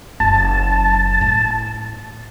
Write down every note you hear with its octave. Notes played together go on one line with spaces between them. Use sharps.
F#1 A5
A2